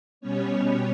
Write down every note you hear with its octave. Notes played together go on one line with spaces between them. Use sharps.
B2 G3 B3 C#4 C#5